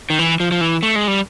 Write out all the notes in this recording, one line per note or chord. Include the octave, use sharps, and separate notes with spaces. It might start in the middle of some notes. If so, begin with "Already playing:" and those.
D#3
E3
F3
F3
E3
A3
G#3
G3